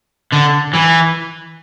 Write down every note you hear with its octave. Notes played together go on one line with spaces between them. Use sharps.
D3
E3